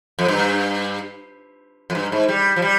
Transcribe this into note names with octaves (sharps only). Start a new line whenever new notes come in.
F2
G2
F2
G2
G#2
G3
F3
G3